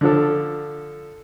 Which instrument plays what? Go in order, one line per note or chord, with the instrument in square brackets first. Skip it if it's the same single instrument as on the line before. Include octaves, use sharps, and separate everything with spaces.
[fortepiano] D3 F3 A4